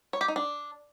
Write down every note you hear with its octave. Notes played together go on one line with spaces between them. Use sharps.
C#5
G4
D#4
D4